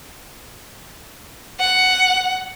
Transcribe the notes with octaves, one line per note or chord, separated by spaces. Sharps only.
F#5